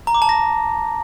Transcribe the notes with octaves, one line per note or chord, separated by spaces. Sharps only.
A#5
D6
A5
A#6